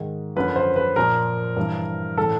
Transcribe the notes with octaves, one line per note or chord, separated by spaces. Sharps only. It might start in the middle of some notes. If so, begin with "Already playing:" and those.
Already playing: G#2 D#3
F#2 D3 F3 B4
C5
B4
A#2 F3 A#4
G2 E3
A2 E3 A4